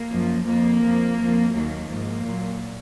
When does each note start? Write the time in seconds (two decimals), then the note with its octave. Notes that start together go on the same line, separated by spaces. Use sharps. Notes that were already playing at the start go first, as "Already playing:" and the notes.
Already playing: A#3
0.10 F#2 F3
0.45 F2 F3 A#3
0.82 F2 F3
1.18 F2 F3
1.52 D#2 D#3 F#3 A#3
1.88 G#2 F3 A#3
2.24 A#2 F#3